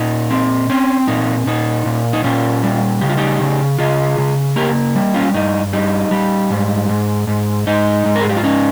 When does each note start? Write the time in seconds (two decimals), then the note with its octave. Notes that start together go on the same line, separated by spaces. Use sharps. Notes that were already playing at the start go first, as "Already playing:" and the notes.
Already playing: A#2 D#4
0.31 C4
0.70 C4 C#4
1.08 A#2 D#4
1.46 A#2 D#4
1.86 A#2
2.13 D#4
2.24 A#2 C#4 F4
2.64 G3
3.01 C#3 G4
3.09 F4
3.17 D#4 G4
3.41 C#3
3.79 C#3 F4 G#4
4.18 C#3
4.56 A#3 G4 A#4
4.95 G3
5.14 C#4 F4
5.34 G2 D#4
5.73 G3 D#4
6.11 G3
6.51 G#2
6.89 G#2
7.27 G#2
7.67 G#2 D#4
8.05 G#2
8.16 A#4
8.22 G#4
8.29 G4
8.37 F4
8.43 C#4 D#4